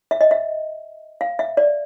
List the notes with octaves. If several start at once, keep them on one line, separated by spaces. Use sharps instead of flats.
E5
D#5
E5
F5
E5
D5